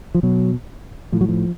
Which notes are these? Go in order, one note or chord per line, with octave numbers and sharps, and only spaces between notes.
F3
B2 F#3
A2 F3
F#3
F3